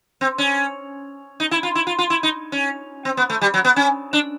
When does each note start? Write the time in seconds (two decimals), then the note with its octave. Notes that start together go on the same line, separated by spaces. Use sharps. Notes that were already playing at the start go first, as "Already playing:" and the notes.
0.21 C4
0.38 C#4
1.40 D#4
1.51 E4
1.63 F4
1.75 E4
1.87 F4
1.98 F4
2.10 E4
2.23 D#4
2.52 C#4
3.05 C4
3.17 B3
3.30 A3
3.41 G3
3.54 F#3
3.65 B3
3.76 C#4
4.13 D4